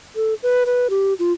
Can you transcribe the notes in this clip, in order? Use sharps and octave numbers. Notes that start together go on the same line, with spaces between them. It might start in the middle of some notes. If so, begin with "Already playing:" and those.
A4
B4
B4
G4
F4